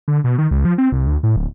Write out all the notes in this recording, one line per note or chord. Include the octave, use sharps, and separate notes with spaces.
D3
B2
D#3
C#2
F3
C4
C2
D2
A2
D1